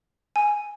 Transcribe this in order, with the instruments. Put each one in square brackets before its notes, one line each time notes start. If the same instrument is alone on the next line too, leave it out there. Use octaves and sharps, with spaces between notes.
[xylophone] G#5